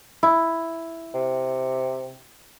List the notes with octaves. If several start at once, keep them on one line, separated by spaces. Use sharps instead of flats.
E4
C3